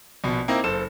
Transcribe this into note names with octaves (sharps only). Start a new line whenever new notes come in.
A#1 B2
A#3 C4 D#4 E4 A#4 D#5
F#1 A4 C5 E7